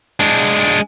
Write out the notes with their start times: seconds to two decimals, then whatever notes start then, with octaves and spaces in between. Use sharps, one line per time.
0.20 G#3 D4